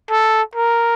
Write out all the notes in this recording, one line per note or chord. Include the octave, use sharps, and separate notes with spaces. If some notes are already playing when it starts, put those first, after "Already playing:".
A4
A#4